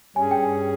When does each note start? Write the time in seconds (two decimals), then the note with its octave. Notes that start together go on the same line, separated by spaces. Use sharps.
0.16 G2 G3 C#4 G#4 G#5
0.31 G5
0.43 G#5